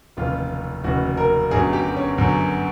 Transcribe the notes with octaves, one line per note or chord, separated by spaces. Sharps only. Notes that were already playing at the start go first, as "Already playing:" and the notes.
F1 D#2 C#3 E3 F4
F1 D#2 C#3 E3 F#4
A#4
G1 F#2 D3 F#3 G#4
G4
C#4
G1 F#2 D3 F#3